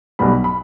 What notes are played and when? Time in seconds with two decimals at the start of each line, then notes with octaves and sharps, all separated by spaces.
0.19 B1 B2 G3 B5
0.44 B5